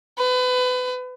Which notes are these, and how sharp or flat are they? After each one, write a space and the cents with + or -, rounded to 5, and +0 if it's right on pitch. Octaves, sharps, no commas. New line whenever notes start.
B4 +30